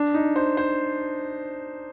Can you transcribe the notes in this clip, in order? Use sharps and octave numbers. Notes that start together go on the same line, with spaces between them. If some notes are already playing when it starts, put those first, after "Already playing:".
Already playing: D4
D#4
C5
C5